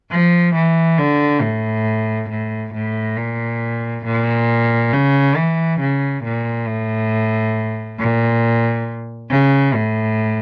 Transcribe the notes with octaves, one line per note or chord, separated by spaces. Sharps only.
F3
E3
D3
A2
A2
A2
A#2
A#2
C#3
E3
C#3
A#2
A2
A#2
C#3
A2